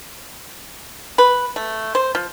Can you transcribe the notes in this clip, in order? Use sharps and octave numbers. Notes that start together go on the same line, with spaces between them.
B4
A3
C5
F3